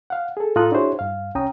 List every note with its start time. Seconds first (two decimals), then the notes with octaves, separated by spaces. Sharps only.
0.10 F5 F#5
0.37 G#4 A4
0.56 A2 F4 A4 A#5 D#6 F#6
0.72 D4 E4 F#4 G#4 C5 C#5
0.99 G2 F5
1.35 C2 C#4 G5 A#5 D#6